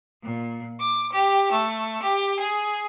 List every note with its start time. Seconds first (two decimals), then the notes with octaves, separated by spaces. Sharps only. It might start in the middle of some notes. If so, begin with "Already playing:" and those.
0.22 A#2
0.78 D6
1.12 G4
1.53 A3
2.02 G4
2.38 G#4